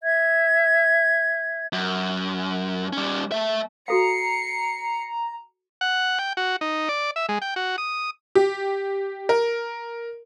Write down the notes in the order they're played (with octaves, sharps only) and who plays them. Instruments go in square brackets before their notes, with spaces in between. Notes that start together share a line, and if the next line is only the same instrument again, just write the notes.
[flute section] E5 G#6
[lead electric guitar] F#2
G3 C#4
A3 E5
[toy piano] F#4 A4 F5 [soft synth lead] A#5 [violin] C7 C#7
[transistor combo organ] F#5
G5
F#4
D#4
D5
E5
G#3
G5
F#4
D#6
[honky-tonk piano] G4
A#4